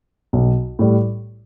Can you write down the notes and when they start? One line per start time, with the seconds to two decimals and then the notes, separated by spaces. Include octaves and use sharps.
0.33 B1
0.79 A2 G3